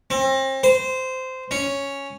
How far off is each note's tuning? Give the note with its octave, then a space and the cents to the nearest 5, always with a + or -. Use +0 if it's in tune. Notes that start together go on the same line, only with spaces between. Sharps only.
C4 +35
C5 -15
C#4 +0